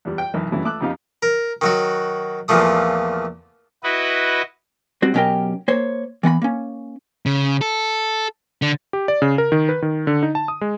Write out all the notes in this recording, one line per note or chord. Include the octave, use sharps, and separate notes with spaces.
E2 G3
G5
B1 E3 A#4
G2 C#3 E3 F#3 A3
A3 D6 E6 F#6
F2 C#3 B3 D#4 G4 F5
A#4
D#3 F#3 F#4
E2 A#2 F3 A3 D#6
E4 F#4 B4 D#5
G3 C4 F#4
B2 F#3 C#4 G4 A#4 G5
A#3 C5 C#5
E3 B3 F#5 B5
A#3 C#4
C#3
A4
D3
G4
D5
C#3
A#4
D#3
B4
D#3
D3
D#4
A5
D#6
G#3